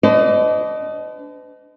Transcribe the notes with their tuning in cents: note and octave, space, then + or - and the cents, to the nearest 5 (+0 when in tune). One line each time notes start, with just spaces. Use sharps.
D4 -25 B4 +45 D#5 +0